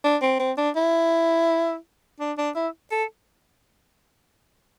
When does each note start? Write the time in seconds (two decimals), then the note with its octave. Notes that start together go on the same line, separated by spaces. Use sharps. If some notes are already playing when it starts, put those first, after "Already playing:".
0.04 D4
0.22 C4
0.40 C4
0.58 D4
0.76 E4
2.20 D4
2.38 D4
2.55 E4
2.92 A4